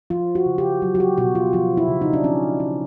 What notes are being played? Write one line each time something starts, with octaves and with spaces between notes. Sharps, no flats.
F3 F4
F#4
C#3
G4
F#3
F#4
G4
B2 F#4
F4
F3 F4
E4
C#3
D#4
D4
F3 C#4
C#4